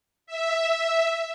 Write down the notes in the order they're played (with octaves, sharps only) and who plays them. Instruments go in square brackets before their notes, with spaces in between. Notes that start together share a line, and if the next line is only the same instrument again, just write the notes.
[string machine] E5